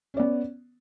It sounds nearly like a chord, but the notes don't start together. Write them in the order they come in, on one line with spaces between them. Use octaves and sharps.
C#4 D5 B3